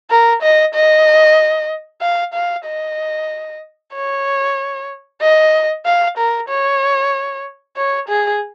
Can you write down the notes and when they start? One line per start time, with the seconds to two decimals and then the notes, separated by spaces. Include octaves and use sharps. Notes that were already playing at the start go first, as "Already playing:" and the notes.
0.10 A#4
0.42 D#5
0.74 D#5
2.01 F5
2.34 F5
2.65 D#5
3.94 C#5
5.21 D#5
5.85 F5
6.17 A#4
6.48 C#5
7.76 C#5
8.08 G#4